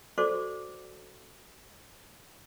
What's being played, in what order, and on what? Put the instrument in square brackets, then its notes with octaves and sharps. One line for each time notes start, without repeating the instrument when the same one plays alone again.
[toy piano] F#4 A4 C5 D5 C#6 D6